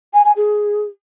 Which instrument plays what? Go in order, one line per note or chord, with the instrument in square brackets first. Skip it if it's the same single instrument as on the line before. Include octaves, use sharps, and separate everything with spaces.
[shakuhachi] G#5
G#5
G#4